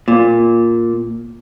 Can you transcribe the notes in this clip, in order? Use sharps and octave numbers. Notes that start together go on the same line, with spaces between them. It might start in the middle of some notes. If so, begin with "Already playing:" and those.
A#2